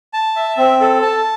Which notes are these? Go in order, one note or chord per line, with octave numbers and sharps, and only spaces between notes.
A5
E5
C4
A4
A5